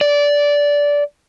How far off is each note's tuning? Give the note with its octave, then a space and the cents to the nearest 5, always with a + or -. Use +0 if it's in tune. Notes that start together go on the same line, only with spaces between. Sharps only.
D5 -15